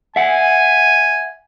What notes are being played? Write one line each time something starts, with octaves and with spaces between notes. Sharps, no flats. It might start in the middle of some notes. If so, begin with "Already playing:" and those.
E5 F#5 G#5